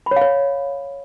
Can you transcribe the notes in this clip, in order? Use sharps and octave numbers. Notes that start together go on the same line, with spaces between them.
B5
C#5
F5
C#5